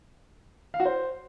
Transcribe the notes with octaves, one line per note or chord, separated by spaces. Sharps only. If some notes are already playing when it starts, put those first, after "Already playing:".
F5
F#4
C5